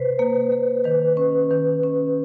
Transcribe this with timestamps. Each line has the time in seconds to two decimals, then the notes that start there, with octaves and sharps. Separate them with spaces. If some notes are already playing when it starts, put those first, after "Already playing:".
Already playing: C3 B4 C5
0.19 A#3
0.52 A#3
0.84 D#3 B4
1.17 C#4
1.51 D#3
1.84 C#4